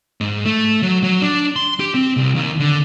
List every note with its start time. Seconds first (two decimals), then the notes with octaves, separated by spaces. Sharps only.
0.21 G#2
0.45 A3
0.82 F#3
1.03 F#3
1.22 D4
1.56 C6
1.80 G4
1.94 C4
2.17 C2
2.35 D#2
2.60 D3